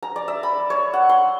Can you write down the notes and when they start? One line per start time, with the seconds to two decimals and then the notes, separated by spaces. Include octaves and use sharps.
0.03 A#5
0.16 D5
0.28 E5
0.43 B5
0.70 C#5
0.94 F#5
1.09 C6